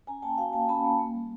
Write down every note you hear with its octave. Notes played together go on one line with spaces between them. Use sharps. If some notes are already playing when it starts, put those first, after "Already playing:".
C#4 G#5 A#5
A#3 G5 A5
F#4 F5 G5
A#3 G5 A5
C#4 A5 B5
A#3
A#3
G3